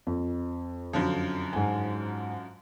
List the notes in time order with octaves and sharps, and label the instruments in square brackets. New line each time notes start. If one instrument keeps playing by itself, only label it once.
[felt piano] F2
[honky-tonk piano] F#2 D3 F3
[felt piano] G#2 G#5